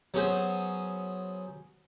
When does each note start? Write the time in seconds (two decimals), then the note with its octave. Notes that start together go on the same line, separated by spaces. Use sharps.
0.14 F#3 B3 C#4 G#4 C5